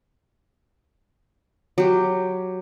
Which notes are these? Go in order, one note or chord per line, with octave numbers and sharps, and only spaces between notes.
F#3 G4